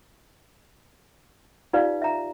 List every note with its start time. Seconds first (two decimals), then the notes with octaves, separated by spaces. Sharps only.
1.73 D#4 F4 G4 B4 D5 F5
2.02 E5 A#5